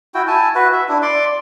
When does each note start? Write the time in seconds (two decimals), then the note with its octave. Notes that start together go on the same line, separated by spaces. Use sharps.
0.14 E4 F#4 G5
0.27 E4 G#5 A5
0.55 F#4 B4
0.73 E5
0.89 D4 E4
1.02 D5 C6 D6